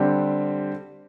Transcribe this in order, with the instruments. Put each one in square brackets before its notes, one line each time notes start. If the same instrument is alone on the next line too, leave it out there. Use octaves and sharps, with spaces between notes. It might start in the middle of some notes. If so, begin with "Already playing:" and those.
Already playing: [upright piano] D3 G3 C4 G4